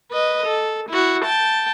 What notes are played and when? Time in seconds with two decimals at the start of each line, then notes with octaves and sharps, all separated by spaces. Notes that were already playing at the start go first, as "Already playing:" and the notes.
0.12 B4 D#5
0.46 A4
0.90 E4 F#4
1.25 G5 A5